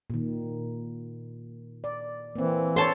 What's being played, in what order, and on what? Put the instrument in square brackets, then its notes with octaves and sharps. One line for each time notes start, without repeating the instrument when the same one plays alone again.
[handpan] A#2 D#3
D5
[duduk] E3 [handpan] A#3 C4
[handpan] A4 C5 [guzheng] C#5 A5 C6